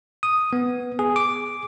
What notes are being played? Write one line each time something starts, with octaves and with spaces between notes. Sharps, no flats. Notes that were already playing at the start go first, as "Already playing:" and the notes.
D#6
B3
G#4
D6